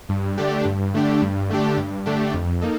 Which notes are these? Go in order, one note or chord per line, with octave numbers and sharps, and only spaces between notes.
G2
D3 A3 D4 G4
G2
D3 A3 D4 G4
G2
D3 A3 D4 G4
G2
D3 A3 D4 G4
F2
A#3 D#4 A4